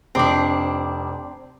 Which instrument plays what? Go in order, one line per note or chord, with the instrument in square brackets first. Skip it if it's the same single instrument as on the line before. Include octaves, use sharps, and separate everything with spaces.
[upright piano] F1 D6 [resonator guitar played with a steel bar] C4 D4